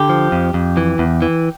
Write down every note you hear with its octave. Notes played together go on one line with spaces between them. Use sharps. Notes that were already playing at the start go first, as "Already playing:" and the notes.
Already playing: D3 G4
F3
F2
F2
E3
E2
E3